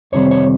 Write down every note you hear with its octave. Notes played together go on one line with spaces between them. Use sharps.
F2 C3 D#3 G3 C4 C#5
C#5